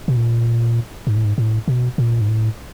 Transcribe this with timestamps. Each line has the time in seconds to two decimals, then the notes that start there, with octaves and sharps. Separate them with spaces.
0.08 B2
0.17 A#2
1.07 G#2
1.16 A2
1.25 G#2
1.38 A2
1.68 B2
1.98 A#2
2.21 G#2
2.29 A2